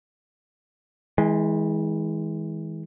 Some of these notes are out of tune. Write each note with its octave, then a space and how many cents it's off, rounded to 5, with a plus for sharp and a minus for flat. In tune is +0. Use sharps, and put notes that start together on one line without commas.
E3 -35 G#3 +0